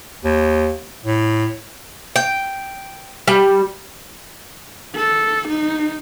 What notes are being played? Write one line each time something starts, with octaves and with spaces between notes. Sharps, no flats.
D#2
A2
G5
G3
A4
D#4